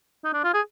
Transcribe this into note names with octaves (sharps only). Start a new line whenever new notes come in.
D#4
D4
F4
G#4